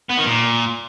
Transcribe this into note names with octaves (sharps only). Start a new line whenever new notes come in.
B3
D#3
A#2